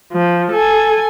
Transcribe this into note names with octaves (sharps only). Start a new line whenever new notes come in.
F3
A4 G#5